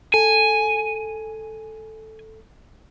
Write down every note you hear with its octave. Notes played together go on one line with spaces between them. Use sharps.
A4 G#5